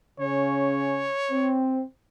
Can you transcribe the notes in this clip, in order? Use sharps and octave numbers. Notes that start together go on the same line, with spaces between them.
C#3 C#4 C#5
C4